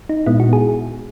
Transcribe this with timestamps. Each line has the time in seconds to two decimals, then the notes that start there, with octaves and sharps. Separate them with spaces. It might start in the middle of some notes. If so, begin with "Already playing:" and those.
0.09 D#4
0.26 A#2 G#3 B3 E4
0.40 F#4
0.53 G#4